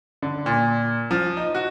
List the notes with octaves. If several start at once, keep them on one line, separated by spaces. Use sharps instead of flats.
D3
A#2
F3
D#4
F#4